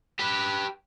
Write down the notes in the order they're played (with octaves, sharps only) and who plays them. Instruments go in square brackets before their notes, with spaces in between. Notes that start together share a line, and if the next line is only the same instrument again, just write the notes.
[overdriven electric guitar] G4 B4